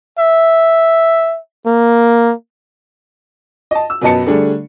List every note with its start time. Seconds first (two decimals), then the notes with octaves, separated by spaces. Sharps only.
0.19 E5
1.66 A#3
3.71 D#5 A5
3.90 E6
4.01 F#2 B2 B4 D#5 A5 C#7
4.26 D3 G3 A3 D4 G#4